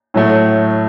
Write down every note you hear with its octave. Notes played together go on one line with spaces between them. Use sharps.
A2 F#3 A3